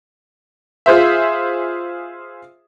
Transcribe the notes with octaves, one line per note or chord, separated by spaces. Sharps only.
F4 G#4 C5 E5